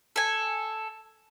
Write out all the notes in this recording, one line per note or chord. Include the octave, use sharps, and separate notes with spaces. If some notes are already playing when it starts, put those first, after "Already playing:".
A4 G#5